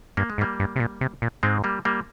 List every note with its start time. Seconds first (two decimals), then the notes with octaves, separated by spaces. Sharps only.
0.17 G2 A#3
0.30 G#3
0.38 G#2
0.41 G3 A#3
0.60 G2
0.76 C3
0.80 A#2
1.01 C3
1.22 A#2
1.43 G#2 G#3 C4
1.64 G3 A#3
1.85 G3 A#3